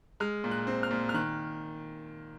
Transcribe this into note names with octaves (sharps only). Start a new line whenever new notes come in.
G#3 F6
A#2
F#6
C4
F6
A#2
F6
D#3 F#6